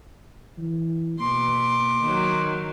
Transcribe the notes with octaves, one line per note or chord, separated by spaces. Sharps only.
E3
B2 A#3 C6 D6
D#3 F#3